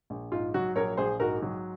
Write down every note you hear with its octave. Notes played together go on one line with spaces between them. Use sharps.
A#1
G#2 F4
F#3 F#4
A#1 A#4 C#5
A#1 G#4 C5
G#2 F#4 A#4
F#3